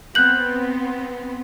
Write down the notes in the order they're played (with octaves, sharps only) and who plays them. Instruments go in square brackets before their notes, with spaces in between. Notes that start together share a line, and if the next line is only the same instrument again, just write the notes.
[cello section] B3 C4 [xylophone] F#6 G6 F#7